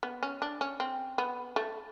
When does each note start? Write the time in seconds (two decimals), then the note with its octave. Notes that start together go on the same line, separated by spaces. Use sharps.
0.03 B3
0.23 C#4
0.42 D4
0.61 C#4
0.80 C4
1.18 B3
1.56 A3